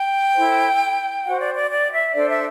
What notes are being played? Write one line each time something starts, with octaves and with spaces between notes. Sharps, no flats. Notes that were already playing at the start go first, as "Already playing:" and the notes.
Already playing: G5
E4 A4 C5
F#4 C5 F#5
D5
D5
D5
E5
D4 A4 C5 D5
E5